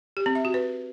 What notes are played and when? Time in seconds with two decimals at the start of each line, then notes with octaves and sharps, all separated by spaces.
0.17 G4
0.26 C4
0.35 E5
0.45 F#4
0.54 B4